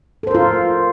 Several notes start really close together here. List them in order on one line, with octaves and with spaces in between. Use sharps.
A4 C5 A#4 F4